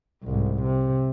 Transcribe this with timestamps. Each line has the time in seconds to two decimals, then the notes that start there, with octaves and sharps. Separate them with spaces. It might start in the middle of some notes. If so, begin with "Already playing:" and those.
0.24 C2 G#2
0.63 C3